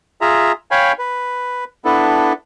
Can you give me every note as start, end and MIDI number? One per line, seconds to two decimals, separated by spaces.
0.21 0.52 65
0.21 0.52 68
0.21 0.52 76
0.21 0.52 82
0.71 0.92 73
0.71 0.92 77
0.71 0.92 79
0.71 0.92 80
0.71 0.92 83
0.99 1.64 71
1.85 2.33 59
1.85 2.33 62
1.85 2.33 64
1.85 2.33 69
1.85 2.33 71